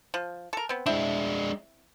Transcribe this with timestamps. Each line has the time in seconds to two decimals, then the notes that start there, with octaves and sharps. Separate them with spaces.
0.14 F3
0.53 A4 A#4
0.69 B3 C4
0.86 G#3 C4 D4 E4 E5